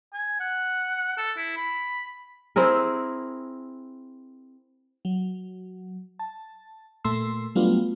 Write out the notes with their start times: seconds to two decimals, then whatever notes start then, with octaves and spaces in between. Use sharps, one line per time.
0.14 G#5
0.40 F#5
1.17 A4
1.37 E4
1.57 B5
2.56 C4 E4 G#4 A#4
5.05 F#3
6.19 A5
7.04 A#2 A3 C6 E6
7.55 F#3 G3 A3 B3 D4 F4